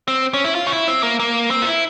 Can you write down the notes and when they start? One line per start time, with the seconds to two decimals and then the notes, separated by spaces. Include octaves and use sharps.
0.08 C4
0.34 C#4
0.44 E4
0.55 F4
0.67 C#4
0.72 E4
0.88 C4
1.03 A#3
1.20 A#3
1.51 C4
1.62 F4
1.67 E4